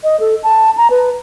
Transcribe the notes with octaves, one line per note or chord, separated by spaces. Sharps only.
D#5
A4
A5
A#5
B4